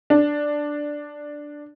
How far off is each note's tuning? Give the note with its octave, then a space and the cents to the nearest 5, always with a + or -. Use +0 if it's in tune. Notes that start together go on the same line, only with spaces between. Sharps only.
D4 +5